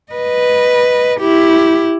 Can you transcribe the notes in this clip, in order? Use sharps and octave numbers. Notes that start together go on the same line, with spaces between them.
B4 D#5
E4 G4